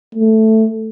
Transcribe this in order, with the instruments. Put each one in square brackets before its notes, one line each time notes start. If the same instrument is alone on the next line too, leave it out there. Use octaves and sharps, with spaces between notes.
[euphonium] A3